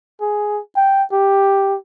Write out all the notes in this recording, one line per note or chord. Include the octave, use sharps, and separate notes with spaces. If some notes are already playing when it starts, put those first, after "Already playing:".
G#4
G5
G4